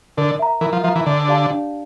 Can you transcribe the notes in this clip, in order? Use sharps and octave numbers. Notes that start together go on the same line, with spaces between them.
D3 A#4
E5 A#5
E3 A#4
F3
F3 E5 A#5
E3
D3 D4
G4 D5 F5 A5
D4